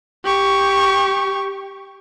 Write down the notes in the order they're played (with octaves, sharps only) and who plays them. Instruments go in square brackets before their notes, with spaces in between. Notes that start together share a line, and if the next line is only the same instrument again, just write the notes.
[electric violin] G4 C#6